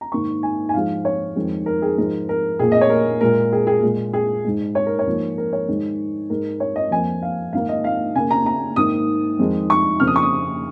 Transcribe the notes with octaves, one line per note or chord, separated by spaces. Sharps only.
A#5
G#2 D#3 A#3 C#6
G#5
G#5
G#2 F3 G#3 F5
C#5
F2 D#3 G#3
A#4
G#4
G#2 F3 G#3 A#4
A#4
A#2 A#3 G#4
D#5
C#5
A#4
A#2 G#3 A#4
G#4
G#4
A#2 G#3
G#4
G#2 G#3
C#5
A#4
C#5
G#2 F3 A#3
A#4
C#5
G#2 D#3 G#3
G#2 G#3 A#4
C#5
D#5
F2 F3 A#3 G#5
F5
G#2 D#3 A#3 F5
D#5
F5
C#3 A#3 G#5
A#5
A#5
G#2 D#3 A#3 D#6
F2 D#3 G#3
C#6
F2 C#3 A#3 F6
D#6
C#6
D#6